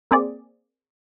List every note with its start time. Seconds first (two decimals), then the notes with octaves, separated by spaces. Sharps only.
0.11 A#3 C4 G#4 D5